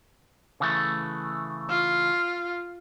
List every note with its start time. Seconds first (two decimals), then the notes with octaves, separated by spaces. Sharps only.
0.60 C#3 E3 A3
1.69 F4